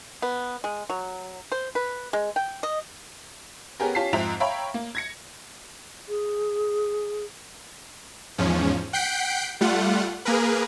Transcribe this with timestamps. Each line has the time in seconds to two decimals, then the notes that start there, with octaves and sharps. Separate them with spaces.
0.22 B3
0.64 G#3
0.90 F#3
1.52 C5
1.75 B4
2.13 G#3
2.36 G5
2.63 D#5
3.80 B3 C#4 G4 G#4 A#4
3.95 C#4 F4 G4 A5 B6 C7
4.13 F2 G#2 C5 E5 A#5 F7
4.40 C#5 E5 F5 G5 A#5 B5
4.74 A#3
4.95 G#6 A#6 C#7
6.09 G#4
8.38 E2 G#2 F3 C#4
8.93 F#5 G5 G6 B6 C7 D7
9.61 G3 A3 F4 F#5
10.25 A#3 G#4 A#4 B4